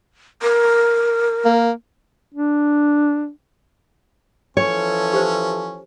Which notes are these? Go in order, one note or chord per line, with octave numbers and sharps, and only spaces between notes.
A#4
A#3
D4
E3 F3 C#4 A4 C#5
G4 C5